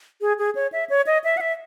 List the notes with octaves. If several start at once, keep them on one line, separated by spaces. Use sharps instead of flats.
G#4
G#4
C#5
E5
C#5
D#5
E5
F#5
E5